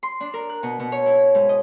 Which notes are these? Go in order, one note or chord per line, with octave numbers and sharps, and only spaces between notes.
C6
D4
A#4
F#6
B2
B2
C#5
E4
G#2
D#5